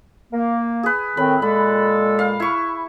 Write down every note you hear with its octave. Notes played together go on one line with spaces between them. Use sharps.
A#3
G#4 B4
A2 D#3 C4 B5
A#2 G#3 A4 B5
F5
E4 C#6